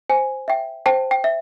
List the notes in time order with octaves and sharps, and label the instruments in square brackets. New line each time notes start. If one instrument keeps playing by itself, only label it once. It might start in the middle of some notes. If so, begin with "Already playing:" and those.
[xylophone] C5 G#5
E5 G5
C5 G5 A5
G5
E5